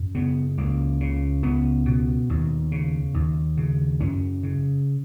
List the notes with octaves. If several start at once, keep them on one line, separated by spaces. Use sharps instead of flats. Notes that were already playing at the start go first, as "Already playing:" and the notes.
Already playing: F#2
C#3 B3
C#2 A#3
C#3
C#2 B3
B2
D#2
C#3
D#2
C#3
F#2 C#4
C#3